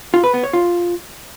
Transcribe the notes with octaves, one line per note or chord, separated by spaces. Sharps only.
F4
B4
B3
C#5
F4